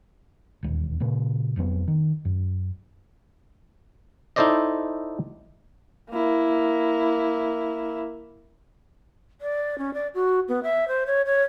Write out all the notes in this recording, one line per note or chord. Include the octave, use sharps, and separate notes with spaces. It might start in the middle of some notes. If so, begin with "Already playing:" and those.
E1 D#2
A#2 C#3 A#3
F1 F2 F#3 B3
D#3
F#2
D#4 E4 A4 C5 D5 D#5
A#3 E4
D5
C#4
D5
F#4
B3
E5
C5
C#5
C#5